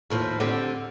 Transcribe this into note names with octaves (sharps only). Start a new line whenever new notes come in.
D#2 A2 F3
D3 C4 G4